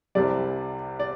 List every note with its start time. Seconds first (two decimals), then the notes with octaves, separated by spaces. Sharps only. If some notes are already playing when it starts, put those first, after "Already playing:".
0.15 C2 C3 G3 D5
1.00 D5